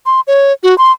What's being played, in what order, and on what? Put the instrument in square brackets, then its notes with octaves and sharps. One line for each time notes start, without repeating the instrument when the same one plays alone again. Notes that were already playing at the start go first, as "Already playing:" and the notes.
[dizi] C6
C#5
F#4
C6